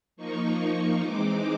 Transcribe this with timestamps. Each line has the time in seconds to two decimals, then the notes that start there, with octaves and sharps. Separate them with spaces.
0.16 F3 A#3 D#4 C#6
1.00 E3 G#3 C4 D#4 D6